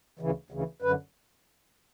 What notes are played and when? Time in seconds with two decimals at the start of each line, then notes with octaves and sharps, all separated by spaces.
0.19 D2 C#3 E3
0.51 D2 C#3 E3
0.82 F#2 D3 B4